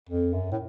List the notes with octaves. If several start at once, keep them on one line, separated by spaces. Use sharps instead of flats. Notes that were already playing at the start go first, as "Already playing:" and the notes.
F2
F#2
A2